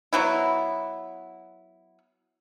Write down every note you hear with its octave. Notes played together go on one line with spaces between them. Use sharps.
F#3 B3 E4